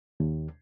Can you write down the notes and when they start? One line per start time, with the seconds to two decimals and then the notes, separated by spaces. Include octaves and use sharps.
0.20 D#2